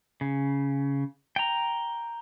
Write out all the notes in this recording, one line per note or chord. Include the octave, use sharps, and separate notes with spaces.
C#3
G5 A#5